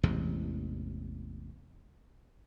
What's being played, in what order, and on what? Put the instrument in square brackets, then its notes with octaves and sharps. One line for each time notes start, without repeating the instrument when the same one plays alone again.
[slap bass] A1 E2 C3 G#3